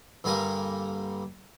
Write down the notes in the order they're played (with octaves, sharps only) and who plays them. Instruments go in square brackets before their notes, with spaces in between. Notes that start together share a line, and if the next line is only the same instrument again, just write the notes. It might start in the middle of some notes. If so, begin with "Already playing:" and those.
[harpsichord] G2 D3 G3 A#3 G#5 A#5